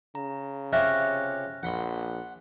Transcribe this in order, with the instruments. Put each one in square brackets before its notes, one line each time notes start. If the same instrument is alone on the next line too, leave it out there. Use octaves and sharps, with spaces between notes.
[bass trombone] C#3 [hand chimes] A#5
[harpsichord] C3 C#4 F4 [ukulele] G4 E5 [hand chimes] F6 F#6 A#6
[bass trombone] A#1 [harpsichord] F#5 B5 C6